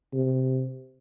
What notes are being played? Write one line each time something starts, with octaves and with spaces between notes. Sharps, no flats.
C3